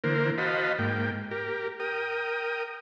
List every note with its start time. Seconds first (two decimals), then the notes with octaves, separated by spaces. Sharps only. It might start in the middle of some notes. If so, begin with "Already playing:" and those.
0.04 D3 E3 A#3 A#4 C5
0.38 F#4 C5 D#5 F5 A5 B5
0.78 G#2 A#3 G5
1.31 G4 A#4
1.80 A#4 G5 D#6